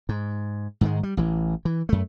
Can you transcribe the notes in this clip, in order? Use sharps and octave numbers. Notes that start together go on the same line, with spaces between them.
G#2
G#2 D#3 G#3
G3
A1 E3
E3
F#2 A3